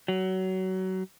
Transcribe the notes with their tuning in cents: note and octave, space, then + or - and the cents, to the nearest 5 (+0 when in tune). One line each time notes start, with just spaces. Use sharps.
F#3 +25